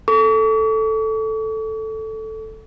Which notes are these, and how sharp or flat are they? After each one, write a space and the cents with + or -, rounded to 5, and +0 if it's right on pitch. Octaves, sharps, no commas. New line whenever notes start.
A4 +0 C#6 +45